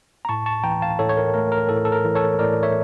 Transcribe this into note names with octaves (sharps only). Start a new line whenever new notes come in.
A#5
A2 A5 C#6
A5 C#6
E3 G5 A#5
F5 A5
A2 A4 C#5
C#5
A#4
A3 A#4
A#4
A2 A4
A4
A#4
E3
A4 C#5
A2 A#4 D5
C#5 E5